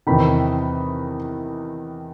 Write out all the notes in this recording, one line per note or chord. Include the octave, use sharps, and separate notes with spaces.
E2 C3 D#3 B5